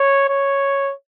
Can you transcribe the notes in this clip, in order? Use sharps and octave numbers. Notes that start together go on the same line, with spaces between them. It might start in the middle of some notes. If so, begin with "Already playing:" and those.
Already playing: C#5
C#5